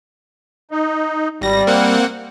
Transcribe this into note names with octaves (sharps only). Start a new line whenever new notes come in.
D#4
G#1 G3 A#6
A#3 C4 F#5